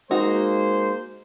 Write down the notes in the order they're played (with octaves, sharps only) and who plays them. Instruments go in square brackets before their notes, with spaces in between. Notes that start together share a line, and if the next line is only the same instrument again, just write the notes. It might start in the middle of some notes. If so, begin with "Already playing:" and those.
[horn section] G#3 A#3 C5 [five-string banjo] D#4 F#4